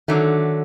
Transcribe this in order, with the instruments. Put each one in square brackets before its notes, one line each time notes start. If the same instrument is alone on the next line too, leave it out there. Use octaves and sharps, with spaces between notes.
[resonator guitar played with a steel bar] D3 F#3 A3 [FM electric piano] D#3